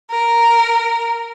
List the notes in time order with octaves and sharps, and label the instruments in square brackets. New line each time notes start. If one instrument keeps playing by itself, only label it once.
[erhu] A#4